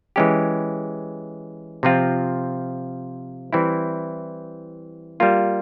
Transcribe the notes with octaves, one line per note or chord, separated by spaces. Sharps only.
E3 G#3 C#4 G4
C3 F3 C4 F4
E3 G3 C4 E4
G3 A#3 F4